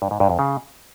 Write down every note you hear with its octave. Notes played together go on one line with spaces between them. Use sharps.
G2
G#2
G2
F2
C#3